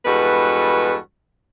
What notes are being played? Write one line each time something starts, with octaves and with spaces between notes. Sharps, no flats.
E2 G2 G#3 F#4 A4 B4